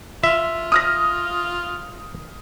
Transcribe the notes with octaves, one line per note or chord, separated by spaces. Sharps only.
F4 E5
D#6 F6 A#6